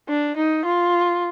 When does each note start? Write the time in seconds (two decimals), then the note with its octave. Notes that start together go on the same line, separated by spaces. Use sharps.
0.09 D4
0.36 D#4
0.65 F4